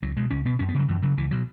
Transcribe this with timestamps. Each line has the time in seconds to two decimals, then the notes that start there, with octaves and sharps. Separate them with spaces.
0.02 C#2 F#3
0.17 B2 G#3
0.30 C#2 C#4
0.45 B2 B3
0.59 F#2 C#4
0.69 B3
0.74 C#3 F#3
0.88 F#2 E3
1.02 C#3 F#3
1.17 C#2 E3
1.31 B2 F#3